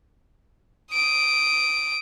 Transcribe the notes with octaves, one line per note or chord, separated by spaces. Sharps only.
D#6 D7